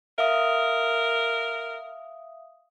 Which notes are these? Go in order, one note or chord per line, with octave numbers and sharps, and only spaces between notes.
A#4 E5 F5 D#6